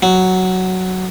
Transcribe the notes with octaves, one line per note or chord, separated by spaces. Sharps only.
F#3